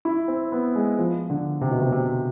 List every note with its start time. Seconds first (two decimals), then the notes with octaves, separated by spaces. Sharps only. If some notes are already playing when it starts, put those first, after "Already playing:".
0.05 E4
0.28 C4
0.52 B3
0.75 G#3
0.99 F3
1.30 D3
1.61 C3
1.71 B2
1.81 C3
1.92 C3